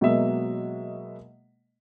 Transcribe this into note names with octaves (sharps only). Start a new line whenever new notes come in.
B2 F#3 G#3 A#3 D#5 E5